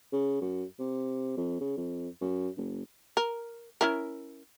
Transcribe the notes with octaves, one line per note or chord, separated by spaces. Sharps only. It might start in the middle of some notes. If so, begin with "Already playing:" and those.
C#3
F#2
C3
F2
C#3
F2
F#2
F#1
A#4
C#4 E4 A#4